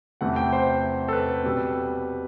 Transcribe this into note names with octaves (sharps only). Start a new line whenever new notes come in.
E2 C3 E3 A3 F#5
G5
C5
A4
B4
B2 G3 C4